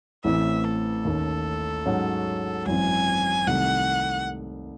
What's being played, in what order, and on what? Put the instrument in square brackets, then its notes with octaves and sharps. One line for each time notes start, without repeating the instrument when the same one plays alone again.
[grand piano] A1 A2 E3 C4 [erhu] E5
[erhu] A4
[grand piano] D#2 D#3 A3 C#4
G#2 F#3 C#4 F#4
[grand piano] G#1 F#2 E3 C4 [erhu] G#5
[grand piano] C2 C3 D#3 A3 [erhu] F#5